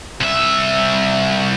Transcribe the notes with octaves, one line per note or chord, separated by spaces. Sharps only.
C2 E5